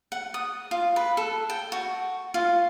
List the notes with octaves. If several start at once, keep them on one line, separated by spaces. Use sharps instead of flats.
F#5
D#6
F4
B4
A4
G5
F#4
F4